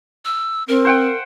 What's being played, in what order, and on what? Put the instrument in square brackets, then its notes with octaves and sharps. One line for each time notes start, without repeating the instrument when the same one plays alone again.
[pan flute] E6
[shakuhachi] C4 [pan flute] A#4
[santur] C5 F#5 G5